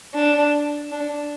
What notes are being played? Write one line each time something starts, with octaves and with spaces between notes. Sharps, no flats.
D4
D4